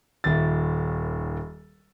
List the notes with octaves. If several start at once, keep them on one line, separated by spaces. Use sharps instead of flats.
D#1 D#2 E5 A6